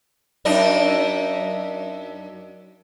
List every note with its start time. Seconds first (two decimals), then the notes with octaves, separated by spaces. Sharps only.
0.45 F#2 D4 D#4